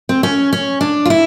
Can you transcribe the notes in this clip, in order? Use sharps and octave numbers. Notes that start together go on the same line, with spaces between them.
C4
C#4
C#4
D4
F4
E4